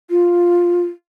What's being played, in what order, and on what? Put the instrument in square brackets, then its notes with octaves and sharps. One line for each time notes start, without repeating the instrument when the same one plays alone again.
[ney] F4